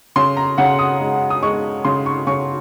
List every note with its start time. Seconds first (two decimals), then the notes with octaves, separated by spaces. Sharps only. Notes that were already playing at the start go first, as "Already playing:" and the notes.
0.16 C#3 C6
0.37 A#5
0.58 C#3 F#5
0.79 D#6
1.00 G#3
1.30 D#6
1.42 G#3 C#6
1.85 C#3 C6
2.06 C#6
2.27 C#3 C#6